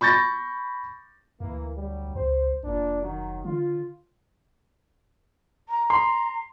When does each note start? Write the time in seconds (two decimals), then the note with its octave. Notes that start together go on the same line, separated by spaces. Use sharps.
0.01 B5 C#6 G6 A6 A#6
1.40 D2 E3 A#3
1.76 D3 F#3 G3
2.15 C#2 C5
2.64 F1 A#2 D4
3.02 D#3 F#3
3.45 D3 F4
5.69 A#5
5.90 C6